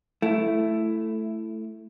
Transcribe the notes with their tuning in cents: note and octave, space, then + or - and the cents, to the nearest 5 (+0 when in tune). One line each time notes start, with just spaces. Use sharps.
A3 +0 E4 +10